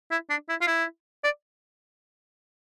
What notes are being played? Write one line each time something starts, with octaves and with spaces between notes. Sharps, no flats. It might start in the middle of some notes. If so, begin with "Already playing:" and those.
E4
D4
E4
F4
E4
D5